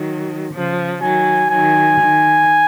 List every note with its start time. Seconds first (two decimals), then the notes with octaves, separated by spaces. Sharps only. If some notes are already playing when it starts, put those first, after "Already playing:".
Already playing: D#3 F#3
0.53 C#3 F3
1.02 D#3 F#3 G#5
1.50 D#3 F#3 G#5
1.99 D#3